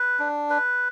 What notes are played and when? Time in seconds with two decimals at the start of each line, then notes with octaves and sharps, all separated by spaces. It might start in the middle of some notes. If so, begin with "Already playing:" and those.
Already playing: B4
0.19 D4
0.50 B4